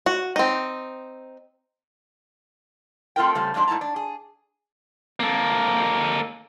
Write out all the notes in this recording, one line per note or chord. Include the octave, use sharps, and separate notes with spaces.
F#4
C4 D#4
A3 C4 F4 A#4 G5
C#3 G3 A3 A#3 C4
F2 G#2 G#3 D4 D#4
G#2 A3 E4 A5 A#5
D4
G#4
A#3 A4